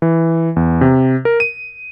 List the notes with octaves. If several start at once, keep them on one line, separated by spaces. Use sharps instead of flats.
E3
E2
C3
A#4
D#7